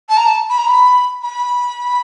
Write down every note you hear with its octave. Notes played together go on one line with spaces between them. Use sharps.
A5
A#5
A5
B5
A#5
B5
B5